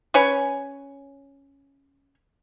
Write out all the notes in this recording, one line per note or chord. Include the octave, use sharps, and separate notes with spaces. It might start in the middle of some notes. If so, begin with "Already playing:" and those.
C#4 B4 C#5 G#5